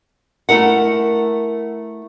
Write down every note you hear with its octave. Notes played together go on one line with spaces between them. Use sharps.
A3 E4 A#4 F#5